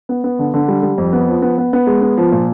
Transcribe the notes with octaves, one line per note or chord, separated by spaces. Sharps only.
B3
B3
D3
D3
G3
G3
F2
B3
F3
B3
B3
B3
G#3
B3
F3
A#2